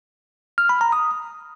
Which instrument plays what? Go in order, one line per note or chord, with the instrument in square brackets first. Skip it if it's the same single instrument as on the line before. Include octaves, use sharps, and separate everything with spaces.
[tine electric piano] F6
B5
A#5
D#6